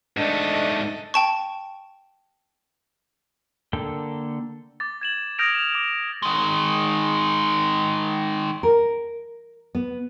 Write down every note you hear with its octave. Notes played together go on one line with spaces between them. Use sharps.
G#2 A3 D4 A4 D#5
G5 A5 C#6
D3 A#3 A4 G5
D6 A6
G#6 E7 F#7
D#6 F6 G6 A#6 D7 F7
E7 F7
D6
D#3 G#3
A#4
B3